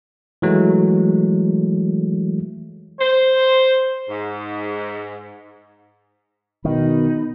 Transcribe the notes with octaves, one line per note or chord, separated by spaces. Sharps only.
E3 F#3 G#3 A3
C5
G#2
B2 D#3 D#4 B5